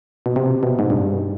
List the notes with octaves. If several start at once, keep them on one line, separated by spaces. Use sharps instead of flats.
B2
C3
B2
G#2
G2